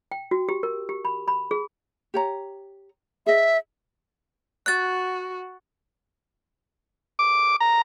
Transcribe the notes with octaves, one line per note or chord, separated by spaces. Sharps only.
G5
F#4
G4
A#4
G4
B5
B5
G#4
G4 C#5 A#5
G#4 D#5 E5
F#4 F#6 A6
D6
A#5